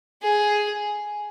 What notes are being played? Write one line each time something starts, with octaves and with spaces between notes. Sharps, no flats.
G#4